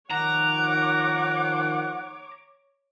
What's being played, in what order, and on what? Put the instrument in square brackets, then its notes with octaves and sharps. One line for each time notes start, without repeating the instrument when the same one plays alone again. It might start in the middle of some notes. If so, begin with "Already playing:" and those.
[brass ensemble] D#3 F3 [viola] C#5 D6 [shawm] F#5 [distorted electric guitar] A#5